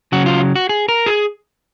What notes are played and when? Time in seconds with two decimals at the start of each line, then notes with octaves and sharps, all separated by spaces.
0.12 C#3 F#3 F#4
0.26 F4
0.56 F#4
0.69 G#4
0.89 A#4
1.06 G#4